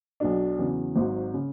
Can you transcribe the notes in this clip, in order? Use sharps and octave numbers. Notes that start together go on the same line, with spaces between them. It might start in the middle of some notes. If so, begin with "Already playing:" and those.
B1 B2 F#3 D4
E2 C#3 F#3
G#1 G#2 F#3
C#3